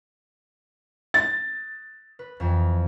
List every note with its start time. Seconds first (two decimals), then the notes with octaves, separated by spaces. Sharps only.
1.14 A6
2.19 B4
2.40 F2 E3